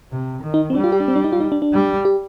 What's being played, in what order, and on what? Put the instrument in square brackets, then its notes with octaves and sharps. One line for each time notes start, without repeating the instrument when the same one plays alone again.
[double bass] C3
D#3
[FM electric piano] D#4
C4
[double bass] G3 [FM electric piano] D4
[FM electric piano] F4
G4
D4
C4
D4
D#4
F4
D#4
D4
D4
[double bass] G3
[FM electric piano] G4